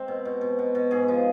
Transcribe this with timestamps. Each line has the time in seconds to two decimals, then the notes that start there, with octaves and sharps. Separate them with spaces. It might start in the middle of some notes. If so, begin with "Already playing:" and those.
Already playing: G#3 C4
0.08 B2
0.25 B2
0.41 B2
0.59 B2
0.75 B2
0.91 G#2 G#4
1.08 F3